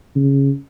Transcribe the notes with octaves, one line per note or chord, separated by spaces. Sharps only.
C#3